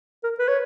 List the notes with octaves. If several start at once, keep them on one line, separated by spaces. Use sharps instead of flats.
A#4
B4
C#5